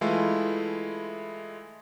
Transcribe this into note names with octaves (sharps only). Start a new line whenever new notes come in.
E3 G#3 A3 E4 F4